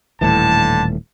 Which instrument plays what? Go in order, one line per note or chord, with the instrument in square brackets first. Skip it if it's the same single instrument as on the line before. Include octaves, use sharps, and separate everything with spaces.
[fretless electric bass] D#1 A2 E3 [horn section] D3 A5